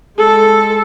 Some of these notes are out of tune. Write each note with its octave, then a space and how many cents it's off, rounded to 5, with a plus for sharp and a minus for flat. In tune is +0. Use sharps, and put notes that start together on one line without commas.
G#3 +0 A4 -5